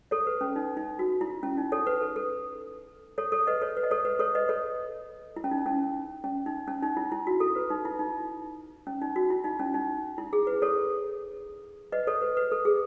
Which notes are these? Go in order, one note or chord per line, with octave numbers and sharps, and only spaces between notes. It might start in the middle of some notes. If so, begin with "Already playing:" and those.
A4 C#5
B4
C#4
D#4
D#4
F#4
E4
C#4
D#4
A4 C#5
B4
A4
A4
A4 C#5
A4 C#5
B4 D#5
A4 C#5
B4
D#5
A4 C#5
B4
A4 C#5
B4 D#5
A4 C#5
E4
C#4
D#4
C#4
C#4
D#4
C#4
D#4
E4
E4
F#4
A4
B4
D#4
E4
D#4
C#4
D#4
F#4
E4
D#4
C#4
D#4
E4
G#4
B4
A4 C#5
B4 D#5
A4 C#5
B4
B4
A4
G#4